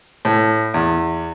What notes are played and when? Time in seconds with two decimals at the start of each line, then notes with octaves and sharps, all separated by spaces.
0.25 A2
0.74 E2